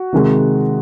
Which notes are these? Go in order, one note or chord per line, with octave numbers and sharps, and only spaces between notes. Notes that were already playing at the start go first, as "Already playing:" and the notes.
Already playing: F#4
C3 D#3 G#3